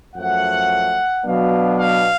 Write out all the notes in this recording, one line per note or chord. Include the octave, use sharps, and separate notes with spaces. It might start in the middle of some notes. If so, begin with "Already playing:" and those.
F#2 F3 A3 F#5
B2 F#3 B3 D4 F5
F5